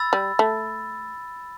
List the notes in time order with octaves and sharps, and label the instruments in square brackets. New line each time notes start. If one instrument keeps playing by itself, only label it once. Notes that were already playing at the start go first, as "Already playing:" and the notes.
Already playing: [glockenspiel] B5 E6 A6
[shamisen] G3
A3